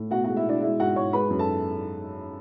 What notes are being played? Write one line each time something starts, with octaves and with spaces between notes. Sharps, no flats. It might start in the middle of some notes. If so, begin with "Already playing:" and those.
Already playing: A2
B2 F#4 F#5
G#3 F#4 F#5
E4 E5
B2 D4 D5
G#3 E4 E5
G#2 F#4 F#5
G#2 C#5 C#6
G#3 B4 B5
F#2
A4 A5